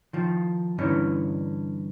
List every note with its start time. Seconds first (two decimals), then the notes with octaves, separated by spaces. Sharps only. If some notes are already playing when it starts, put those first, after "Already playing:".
0.13 D#3 F3
0.78 G2 D3 E3 C#4 D#4